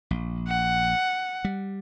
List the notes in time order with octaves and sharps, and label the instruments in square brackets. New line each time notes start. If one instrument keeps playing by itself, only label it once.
[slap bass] A#1
[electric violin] F#5
[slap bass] G3